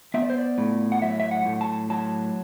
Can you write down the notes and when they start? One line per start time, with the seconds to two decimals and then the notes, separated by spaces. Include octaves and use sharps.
0.14 B3 E5
0.22 D5
0.30 C5
0.38 D5
0.58 A2
0.92 F#5
1.02 F#3 E5
1.20 E5
1.31 F#5
1.46 A2
1.61 A5
1.90 F#3 A5